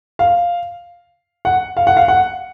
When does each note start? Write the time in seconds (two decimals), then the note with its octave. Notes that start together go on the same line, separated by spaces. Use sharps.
0.19 F5
1.45 F#5
1.77 F5
1.87 F#5
1.97 F5
2.08 F#5